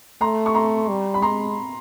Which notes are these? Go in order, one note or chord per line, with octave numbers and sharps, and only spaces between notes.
A3 A#5 C6
C#6
A#5 C6
G3
B5
G#3 A#5 C6